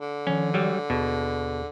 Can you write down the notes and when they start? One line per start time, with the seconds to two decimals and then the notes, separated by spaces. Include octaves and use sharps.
0.01 D3
0.27 D#3 F3 C#4
0.54 F#3 G3
0.90 D#2 B2 G#4